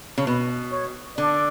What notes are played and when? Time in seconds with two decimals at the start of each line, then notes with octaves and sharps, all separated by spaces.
0.18 C#3
0.27 B2 B4
0.71 C#5
1.17 D3 D5